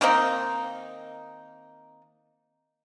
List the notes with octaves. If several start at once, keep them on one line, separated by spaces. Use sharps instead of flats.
D#3 A#3 C4 D#4